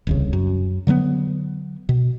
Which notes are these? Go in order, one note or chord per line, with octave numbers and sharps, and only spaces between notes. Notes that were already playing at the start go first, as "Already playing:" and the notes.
D#1 C2 C#3
F#2
D3 F#3 G3 B3
B2